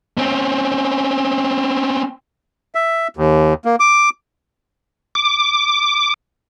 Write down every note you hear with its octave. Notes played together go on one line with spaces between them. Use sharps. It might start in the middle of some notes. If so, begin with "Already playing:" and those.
C4 C#4
E5
D#2
A#3
D6
D6